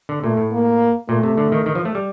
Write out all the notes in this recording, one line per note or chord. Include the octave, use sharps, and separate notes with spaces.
D3
A#2 A3
A2
A#3
A#2 A3
C3
D3
D#3
D#3
F3
A3
G3